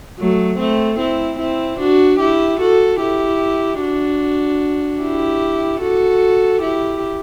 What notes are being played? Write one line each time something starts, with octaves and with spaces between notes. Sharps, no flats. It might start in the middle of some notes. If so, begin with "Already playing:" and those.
F#3 A3
A3 C4
C4 E4
C4 E4
D4 F#4
E4 G4
F#4 A4
E4 G4
D4 F#4
E4 G4
F#4 A4
E4 G4